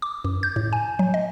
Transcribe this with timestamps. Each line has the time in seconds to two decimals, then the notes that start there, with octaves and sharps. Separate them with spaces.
0.02 D6
0.25 F#2
0.43 G6
0.56 A2
0.73 G#5
0.99 F#3
1.14 D#5